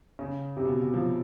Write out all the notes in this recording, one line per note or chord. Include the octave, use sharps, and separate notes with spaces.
C#3
C3
B2
B2
F3